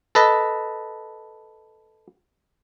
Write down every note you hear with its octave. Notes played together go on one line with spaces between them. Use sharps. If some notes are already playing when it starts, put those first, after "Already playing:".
A4 B4 D#5